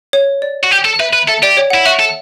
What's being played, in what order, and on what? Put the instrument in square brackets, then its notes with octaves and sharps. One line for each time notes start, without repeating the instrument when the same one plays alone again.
[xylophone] C#5
D5
[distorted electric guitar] F#4
G4
A4
[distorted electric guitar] B4 [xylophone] E5
[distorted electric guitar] B4
[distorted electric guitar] A4 [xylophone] E5
[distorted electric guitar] G4 [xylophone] D5
[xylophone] C#5
[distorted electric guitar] E4 [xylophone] F#5
[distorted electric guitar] F#4 [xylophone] E5
[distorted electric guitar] A4